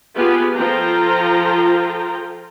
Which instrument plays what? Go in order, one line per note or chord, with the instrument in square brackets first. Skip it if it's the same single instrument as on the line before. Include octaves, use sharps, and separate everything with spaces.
[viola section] B3 F4 G4 G#4 B4
F3 F4 A4 C5 G5 A#5